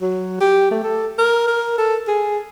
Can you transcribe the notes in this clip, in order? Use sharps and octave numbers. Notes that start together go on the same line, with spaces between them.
F#3
G4
A3
A4
A#4
A#4
A4
G#4